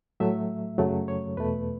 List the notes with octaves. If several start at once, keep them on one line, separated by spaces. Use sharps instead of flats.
A2 F#3 A3 E5
F#2 C#3 F#3 A3
C#5
E2 B2 A3 B4